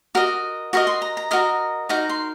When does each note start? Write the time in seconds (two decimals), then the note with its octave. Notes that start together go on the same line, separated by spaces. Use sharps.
0.15 F#4 A#4 D#5
0.73 F#4 A#4 D#5 C#6
0.87 C6
1.02 A#5
1.17 A#5
1.31 F#4 A#4 D#5
1.89 D#4 F#4 A#4 A#5
2.09 C6